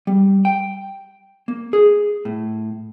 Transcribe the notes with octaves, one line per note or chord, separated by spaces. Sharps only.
G3
G5
A#3
G#4
A2